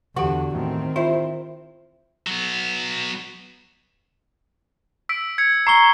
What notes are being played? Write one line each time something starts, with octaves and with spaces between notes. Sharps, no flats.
E2 D3 E3 F#4 G4
E2 A2 D#3 C4
E4 F4 C5 E5
F#3 B3
E6 B6 D7
G#6 C#7
A#5 C#6 C7 G7